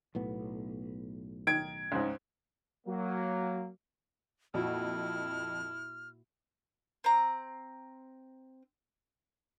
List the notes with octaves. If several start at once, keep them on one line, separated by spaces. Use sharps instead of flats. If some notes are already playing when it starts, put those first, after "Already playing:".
B1 A2 B3
D#3 G#6 D7
C#2 G#2
F#3 A#3
F2 A#2 E4 F#4 F6
C4 A#5